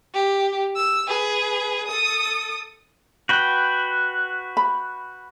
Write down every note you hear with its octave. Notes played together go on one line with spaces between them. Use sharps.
G4
E6
G#4 B4
A4 D#6
F#4 B4 G5
B5